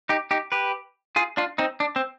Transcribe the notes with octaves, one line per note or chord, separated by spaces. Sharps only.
D#4 G4
D#4 G4
G4 B4
F4 G#4
D4 F4
C4 D#4
D4
C4